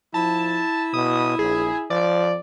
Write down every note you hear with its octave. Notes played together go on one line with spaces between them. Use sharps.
F3 E4 A5
B2 D#6
A#1 G#4
F3 D5